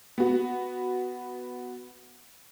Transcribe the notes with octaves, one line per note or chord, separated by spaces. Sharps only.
B3 F#4